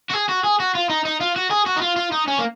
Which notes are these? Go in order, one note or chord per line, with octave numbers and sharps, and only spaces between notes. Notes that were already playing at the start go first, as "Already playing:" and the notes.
F#4
G#4
F#4
G#4
F#4
F4
D#4
D#4
F4
F#4
G#4
F#4
D#4
F4
F4
D#4
C#4
A#3